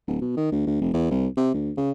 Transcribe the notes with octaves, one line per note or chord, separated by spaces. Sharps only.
D1
B2
D#3
D2
D2
F1
E2
C2
C3
D2
C#3